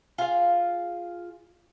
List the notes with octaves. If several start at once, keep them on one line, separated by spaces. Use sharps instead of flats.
F4 G#4 F5